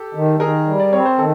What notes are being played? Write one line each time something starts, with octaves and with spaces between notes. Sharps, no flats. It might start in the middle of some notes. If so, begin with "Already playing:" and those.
Already playing: G4 A4
D#3
D#3 G#4 A#4
G3
D5
C4 C#5
C5
D#3 A4